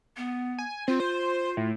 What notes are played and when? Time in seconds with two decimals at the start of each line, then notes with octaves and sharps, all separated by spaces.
0.17 B3
0.59 G#5
0.88 C4 F4
1.00 C5
1.57 A2